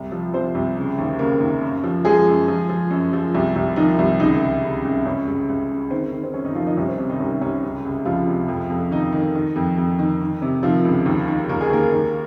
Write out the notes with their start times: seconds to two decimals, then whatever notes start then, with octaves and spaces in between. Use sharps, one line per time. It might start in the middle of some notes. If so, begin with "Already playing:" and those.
Already playing: C2
0.12 F3
0.33 F3 C4 C5
0.55 C2
0.77 C#3
0.98 D#2
1.19 C#3 A#3 A#4
1.40 D#2
1.62 F#2
1.84 F3
2.05 F3 G#3 G#4
2.27 F#2
2.48 F3
2.69 F3
2.91 F#2
3.13 F3
3.34 C2
3.56 C2
3.76 D#3 F3 D#4
3.99 C2
4.19 C#2 D#3 D#4
4.41 C#2
4.63 C#3
4.84 C#2
5.05 C#2 C#4
5.28 C#2
5.49 C#2
5.70 C#3
5.91 D#3 C4
6.12 D#3
6.24 C4
6.34 F#2 C#4
6.45 D#3 D#4
6.55 D#3 F3 F4
6.66 D#3 D#4
6.77 C2 C#4
6.88 C4
6.98 C3 C#4
7.09 D#3 D#4
7.19 C2 C#4
7.41 C2 C#4
7.64 C#2
7.85 C#2
8.05 C#2 F3 F4
8.27 C3
8.48 F2
8.70 F2
8.91 D#3 D#4
9.13 D#3
9.35 D#3
9.56 F2
9.78 F2
9.99 D#3
10.21 D#3
10.42 C3
10.63 D#3 F3 F4
10.85 C#2
11.06 D#2
11.28 D#3
11.49 D#2 A#4
11.61 G#4
11.70 D#2 A#3 A#4
11.92 D#2